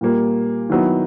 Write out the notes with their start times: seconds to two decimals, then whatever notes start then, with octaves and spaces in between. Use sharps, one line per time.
0.01 A#2 G3 A#3
0.70 D#3 F#3 B3 E4